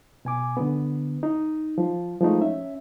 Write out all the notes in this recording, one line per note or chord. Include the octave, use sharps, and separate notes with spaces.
B2 G#5 D6
D3 B3
D#4
F3
F3 G#3 A3 D#4
C#4 E5